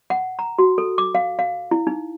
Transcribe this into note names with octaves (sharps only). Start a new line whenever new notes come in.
F#5
A#5
F#4
A4
D6
F5
F5
E4
D#4